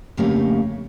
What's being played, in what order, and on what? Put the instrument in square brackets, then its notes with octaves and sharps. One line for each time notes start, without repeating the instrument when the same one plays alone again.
[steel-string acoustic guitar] F2 C#3 A3 A#3 G4 C#5